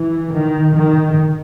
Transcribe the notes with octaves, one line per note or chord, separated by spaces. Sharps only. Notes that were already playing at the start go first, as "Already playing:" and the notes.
Already playing: E3
D#3
D#3